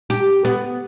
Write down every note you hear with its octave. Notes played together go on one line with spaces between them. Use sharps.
G4
B3